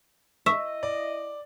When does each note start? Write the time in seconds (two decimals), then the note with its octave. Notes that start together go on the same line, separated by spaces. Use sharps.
0.46 E4 D#5 E5 C#6
0.83 D5